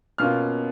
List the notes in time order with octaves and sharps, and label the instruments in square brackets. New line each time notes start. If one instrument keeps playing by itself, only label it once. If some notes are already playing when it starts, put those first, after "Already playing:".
[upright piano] B2 A#3 C#4 F4 F6